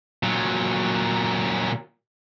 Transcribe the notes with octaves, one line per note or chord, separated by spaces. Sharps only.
A#2 F#3